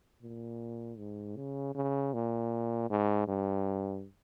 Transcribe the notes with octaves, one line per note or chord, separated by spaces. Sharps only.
A#2
G#2
C#3
C#3
A#2
G#2
G2